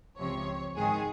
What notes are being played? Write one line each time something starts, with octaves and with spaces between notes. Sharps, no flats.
C#2 C3 F3 C#5
G#2 D#3 G#3 G#4